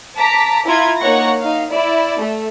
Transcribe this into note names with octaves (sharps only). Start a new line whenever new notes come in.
A5 A#5 D6 B6
E4 F4 A#5 B5 G#6
A#3 D#4 C#5 F#5 C#6 A#6
D#4 F5
E4 D5
A3